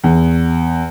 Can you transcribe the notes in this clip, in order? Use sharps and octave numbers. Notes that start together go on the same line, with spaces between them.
E2